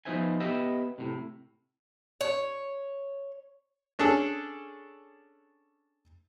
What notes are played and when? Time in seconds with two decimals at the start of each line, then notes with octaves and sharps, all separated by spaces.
0.05 F3 B3 D#4 C5 E5 G#5
0.40 B3 G4 D#5 E5
0.98 A2 C3
2.21 C#5
3.99 C#4 D4 G#4 A4